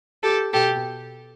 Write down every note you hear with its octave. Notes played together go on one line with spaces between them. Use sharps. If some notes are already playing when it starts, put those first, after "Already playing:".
G4 A4
B2 G4 A4